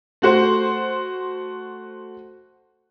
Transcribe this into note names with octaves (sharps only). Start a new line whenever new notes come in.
A3 F#4 C5